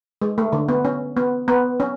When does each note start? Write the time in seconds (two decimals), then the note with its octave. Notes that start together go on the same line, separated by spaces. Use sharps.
0.22 G#3
0.38 A3
0.53 D3
0.69 B3
0.85 C#4
1.17 B3
1.48 B3
1.80 C#4